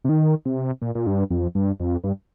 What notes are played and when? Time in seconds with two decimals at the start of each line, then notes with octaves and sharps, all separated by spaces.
0.04 C3
0.09 D#3
0.45 C3
0.82 A#2
0.95 A#2
1.07 G2
1.30 F2
1.55 G2
1.80 F2
2.04 G2